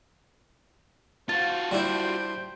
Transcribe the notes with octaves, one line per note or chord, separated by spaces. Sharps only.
F4 F#4 C5 F5 A5
G3 D4 E4 C5 G5